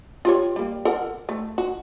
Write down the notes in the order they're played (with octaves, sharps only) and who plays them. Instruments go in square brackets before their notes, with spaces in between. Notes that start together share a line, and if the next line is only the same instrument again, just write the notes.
[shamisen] F4 G4 C#5
G3 A#3
A4 A#4 F#5
A3
F#4